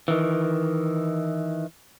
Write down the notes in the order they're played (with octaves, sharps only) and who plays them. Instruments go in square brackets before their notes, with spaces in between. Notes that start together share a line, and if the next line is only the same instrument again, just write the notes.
[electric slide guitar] D#3 E3